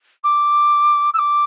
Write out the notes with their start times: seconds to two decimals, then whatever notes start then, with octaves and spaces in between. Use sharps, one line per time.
0.23 D6
1.14 E6
1.18 D6